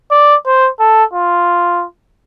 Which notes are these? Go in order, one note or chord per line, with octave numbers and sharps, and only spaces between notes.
D5
C5
A4
F4